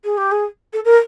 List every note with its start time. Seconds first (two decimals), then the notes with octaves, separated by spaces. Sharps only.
0.04 G#4
0.17 G4
0.31 G#4
0.73 A4
0.85 A#4